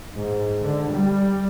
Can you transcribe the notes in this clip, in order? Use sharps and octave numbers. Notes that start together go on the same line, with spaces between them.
G#2
D3
G3